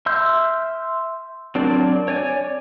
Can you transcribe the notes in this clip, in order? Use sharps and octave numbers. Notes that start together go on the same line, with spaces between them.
E5 C6 E6 F6 G6
F#3 C4 D4 A#4 D5
C#5 D5 G#5